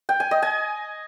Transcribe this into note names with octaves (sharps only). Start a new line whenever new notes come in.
G5
G#5
D#5
G#5